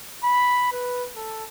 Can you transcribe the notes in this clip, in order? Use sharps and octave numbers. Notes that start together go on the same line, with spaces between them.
B5
B4
A4